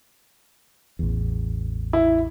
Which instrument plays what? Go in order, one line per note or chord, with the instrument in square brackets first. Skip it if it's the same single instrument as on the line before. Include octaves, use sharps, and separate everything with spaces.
[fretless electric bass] A1 E2
[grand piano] E4